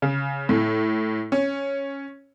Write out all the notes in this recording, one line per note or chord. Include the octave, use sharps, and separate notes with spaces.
C#3
A2
C#4